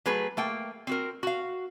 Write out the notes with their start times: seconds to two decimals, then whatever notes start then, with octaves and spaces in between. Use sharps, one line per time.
0.06 F#3 A3 G#4 B4
0.37 A3 A#3 G5
0.87 C4 F#4 A#4
1.23 F#4 F5